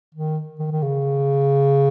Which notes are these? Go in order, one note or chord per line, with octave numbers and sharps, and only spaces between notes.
D#3
D#3
D#3
C#3